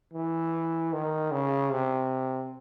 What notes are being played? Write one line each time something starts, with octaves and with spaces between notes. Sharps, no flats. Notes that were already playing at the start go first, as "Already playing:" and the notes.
E3
D#3
C#3
C3